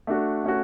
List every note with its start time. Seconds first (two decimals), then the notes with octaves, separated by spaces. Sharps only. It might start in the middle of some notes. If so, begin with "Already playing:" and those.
0.07 A3 D4 F#4
0.44 A3 C#4 F#4